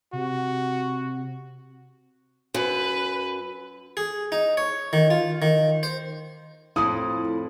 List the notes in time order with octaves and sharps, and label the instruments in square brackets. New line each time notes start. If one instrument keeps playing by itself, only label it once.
[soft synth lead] C3 [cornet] F#4
[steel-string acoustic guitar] F#2 [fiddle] B4
[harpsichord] G#4
D#4
C#5
D#3
F4
D#3
C5
[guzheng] F2 A2 [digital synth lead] E4 [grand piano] D#6